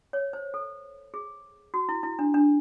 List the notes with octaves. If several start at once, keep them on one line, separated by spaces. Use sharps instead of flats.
C#5
C5
A4
G#4
F#4
E4
E4
D4
D4